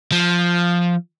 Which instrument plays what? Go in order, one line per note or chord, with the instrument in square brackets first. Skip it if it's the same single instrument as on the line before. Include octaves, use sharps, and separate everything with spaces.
[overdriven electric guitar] F3